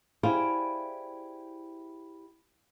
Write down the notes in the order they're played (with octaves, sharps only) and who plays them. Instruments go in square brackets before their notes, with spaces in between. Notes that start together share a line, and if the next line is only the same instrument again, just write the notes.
[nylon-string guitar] E4 G4 G#4 C5 D5 F5